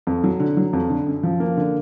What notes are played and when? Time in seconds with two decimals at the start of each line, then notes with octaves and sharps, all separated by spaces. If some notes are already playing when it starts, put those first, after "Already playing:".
0.07 F2
0.24 F#3
0.40 D3
0.57 F#3
0.73 F2
0.89 D3
1.07 F#2
1.23 F3
1.40 A#3
1.57 D3